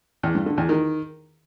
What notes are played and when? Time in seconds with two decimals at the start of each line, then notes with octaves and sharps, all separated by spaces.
0.23 E2
0.35 G2
0.46 D3
0.58 E2
0.69 D#3